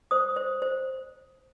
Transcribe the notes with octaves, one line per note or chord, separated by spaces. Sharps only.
C5 D#6
C5
C5